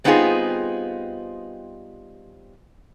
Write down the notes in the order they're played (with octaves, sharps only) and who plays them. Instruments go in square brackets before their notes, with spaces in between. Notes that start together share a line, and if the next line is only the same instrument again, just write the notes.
[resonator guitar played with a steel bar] G3 B3 C4 D#4 F4 G#4